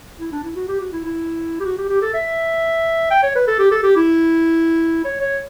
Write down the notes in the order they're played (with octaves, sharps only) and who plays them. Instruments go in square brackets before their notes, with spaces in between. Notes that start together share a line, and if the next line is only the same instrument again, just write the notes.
[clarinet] E4
D4
E4
F#4
G4
F#4
E4
E4
G4
F#4
G4
G4
A4
E5
G5
C#5
B4
A4
G4
A4
G4
E4
C#5
C#5